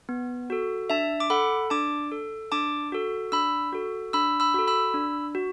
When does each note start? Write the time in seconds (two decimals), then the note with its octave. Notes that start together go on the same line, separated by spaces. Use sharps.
0.09 B3
0.50 F#4 A4
0.90 D4 E5 A5
1.20 D6
1.30 A4 F#5 B5
1.70 D4 A5 D6
2.12 A4
2.52 D4 A5 D6
2.92 F#4 A4
3.32 D4 B5 E6
3.72 F#4 A4
4.13 D4 B5 E6
4.40 B5 E6
4.54 F#4 A4
4.67 B5 E6
4.94 D4
5.35 F#4